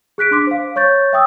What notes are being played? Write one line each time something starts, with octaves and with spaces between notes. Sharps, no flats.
G#4 F#6 B6 D7
D4 C6 D6 B6
C5 F5
C#5 C#6 G6 A6
E5 G5 D#6 E6